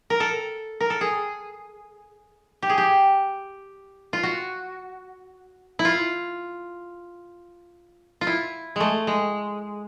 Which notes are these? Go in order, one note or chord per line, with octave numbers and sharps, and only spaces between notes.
A#4
A4
A#4
A4
G#4
G4
G#4
G4
F4
F#4
E4
F4
F4
E4
G#3 A3
G#3